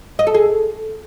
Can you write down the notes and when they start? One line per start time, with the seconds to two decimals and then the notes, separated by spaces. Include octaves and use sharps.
0.19 D#5
0.27 A4
0.34 G#4